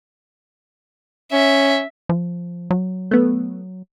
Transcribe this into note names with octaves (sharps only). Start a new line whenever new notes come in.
C#4 E5
F3
F#3
A3 B3